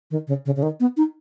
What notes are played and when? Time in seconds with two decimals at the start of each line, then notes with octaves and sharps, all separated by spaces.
0.11 D#3
0.28 C#3
0.46 C#3
0.56 C#3
0.63 D#3
0.80 B3
0.97 D#4